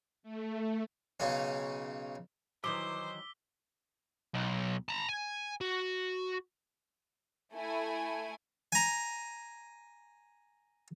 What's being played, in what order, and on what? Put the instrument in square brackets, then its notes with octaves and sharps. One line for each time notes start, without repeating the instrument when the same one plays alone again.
[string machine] A3
[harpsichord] B1 C#3 C#4
[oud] D#3 E3 F#3 [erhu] C5 [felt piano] D6 [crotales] E6 B6 G7
[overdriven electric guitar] B1
A5 A#5
G#5
F#4
[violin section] A3 E4 G#5
[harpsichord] G#5 A#5